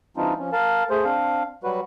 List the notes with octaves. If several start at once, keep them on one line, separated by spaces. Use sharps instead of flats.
E3 G3 C4 D4 D#4 F4
F3 C#4
A#4 F5 A5
A3 G#4 C5
C4 D4 F5
F#3 G3 F#4 B4